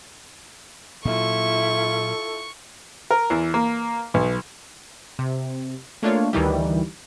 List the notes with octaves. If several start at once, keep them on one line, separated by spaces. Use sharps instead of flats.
A#2 F#3 E4 F4 A4 C#6
A#4
E2
A#3
B1
C3
A3 A#3 D4 F4 C#5
D2 D#3 E3 G3